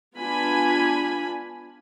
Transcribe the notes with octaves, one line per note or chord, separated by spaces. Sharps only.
B3 D4 F4 G#5 B5